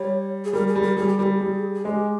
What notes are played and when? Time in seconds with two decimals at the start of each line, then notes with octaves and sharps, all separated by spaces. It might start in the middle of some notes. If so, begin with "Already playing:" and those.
Already playing: G3 C#5
0.45 G#4
0.53 G3 A#4
0.68 G#4
0.76 G3
0.83 A#4
0.97 G3 G#4
1.08 G4
1.19 G3 G#4 A#4
1.41 G3
1.74 G#4
1.85 G#3 G4